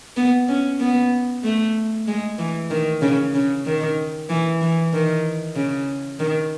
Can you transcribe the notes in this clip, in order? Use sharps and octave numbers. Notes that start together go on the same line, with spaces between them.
B3
C#4
B3
A3
G#3
E3
D#3
C#3
C#3
D#3
E3
E3
D#3
C#3
D#3